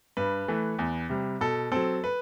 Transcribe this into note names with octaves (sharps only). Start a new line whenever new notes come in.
G2 B4
E3 A3
E2
C3 G3
B2 A4
F#3 C4 A4
B4